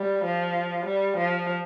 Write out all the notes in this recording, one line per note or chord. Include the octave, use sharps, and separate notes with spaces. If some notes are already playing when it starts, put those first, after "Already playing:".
Already playing: G3
F3
G3
F3